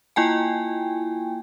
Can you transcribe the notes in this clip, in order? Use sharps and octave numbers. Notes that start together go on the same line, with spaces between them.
A#3 E4 F4 G5 G#5